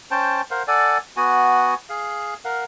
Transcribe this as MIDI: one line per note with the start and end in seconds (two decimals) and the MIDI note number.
0.11 0.41 61
0.11 0.41 72
0.11 0.41 79
0.11 0.41 81
0.51 0.63 70
0.51 0.63 72
0.51 0.63 77
0.51 0.63 78
0.68 0.98 69
0.68 0.98 74
0.68 0.98 78
0.68 0.98 80
1.17 1.74 59
1.17 1.74 66
1.17 1.74 78
1.17 1.74 80
1.89 2.34 68
1.89 2.34 77
2.45 2.64 70
2.45 2.64 77
2.45 2.64 78